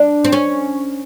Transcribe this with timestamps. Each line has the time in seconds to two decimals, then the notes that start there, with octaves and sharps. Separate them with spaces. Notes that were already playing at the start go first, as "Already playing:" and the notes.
Already playing: D4
0.24 C4
0.33 C#4